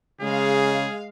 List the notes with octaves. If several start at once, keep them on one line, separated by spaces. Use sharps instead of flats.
C#3 G#3 G#4 F5